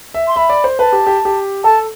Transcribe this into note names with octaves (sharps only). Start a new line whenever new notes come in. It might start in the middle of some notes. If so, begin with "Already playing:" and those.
E5
C6
E5 B5
D5
C5
B4 A5
G4
G4
G4
A4 A5